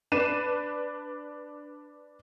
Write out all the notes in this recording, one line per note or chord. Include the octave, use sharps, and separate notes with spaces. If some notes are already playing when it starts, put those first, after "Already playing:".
D4 B4 C7 D#7 E7